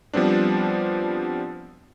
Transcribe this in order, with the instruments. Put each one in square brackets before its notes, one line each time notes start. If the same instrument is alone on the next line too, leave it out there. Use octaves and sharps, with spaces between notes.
[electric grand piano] F3 G3 B3 C4 D4